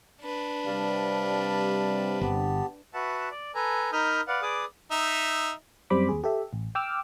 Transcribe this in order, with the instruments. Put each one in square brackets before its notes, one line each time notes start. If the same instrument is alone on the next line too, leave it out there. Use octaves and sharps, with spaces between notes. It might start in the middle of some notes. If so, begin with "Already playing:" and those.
[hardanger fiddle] D4 B4
[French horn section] C3 G3 [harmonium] D5 F5 A5
[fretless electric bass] G1 [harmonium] B3 G4 A5
[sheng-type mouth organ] F#4 B4 E5 F#5 A5
D5
A4 B4 G#5 A#5
D#4 A#4 B5 D#6 F6 G6
B4 D5 F5 F#5
G#4 B4 D5 D6 D#6
[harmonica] D#4 E5
[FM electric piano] F#2 G3 C4 C5 B5 D6
D#2 G#4
G4 A4 E5
A1
G5 D6 E6 F6